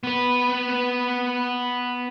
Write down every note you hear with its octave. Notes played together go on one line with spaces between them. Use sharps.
B3 B4